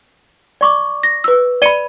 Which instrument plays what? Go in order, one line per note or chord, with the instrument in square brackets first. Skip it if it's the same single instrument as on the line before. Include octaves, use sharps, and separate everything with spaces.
[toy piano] D5 C#6 D6
[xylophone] A#6
B4 E6
[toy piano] D5 B5 [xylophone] C#7 D#7 G7